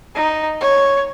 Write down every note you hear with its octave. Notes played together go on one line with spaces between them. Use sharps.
D#4
C#5